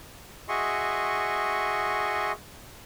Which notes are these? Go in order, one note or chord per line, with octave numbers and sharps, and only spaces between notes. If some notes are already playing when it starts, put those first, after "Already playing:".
F#4 G#4 D#5 E5 C6 C#6